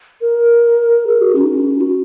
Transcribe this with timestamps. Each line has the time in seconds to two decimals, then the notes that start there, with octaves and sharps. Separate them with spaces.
0.21 A#4
1.07 G#4
1.21 F#4
1.36 C#4
1.44 D#4
1.52 C#4
1.81 F#4